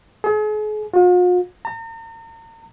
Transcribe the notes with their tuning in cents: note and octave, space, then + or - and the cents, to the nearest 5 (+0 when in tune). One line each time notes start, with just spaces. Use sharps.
G#4 +40
F4 +45
A#5 -40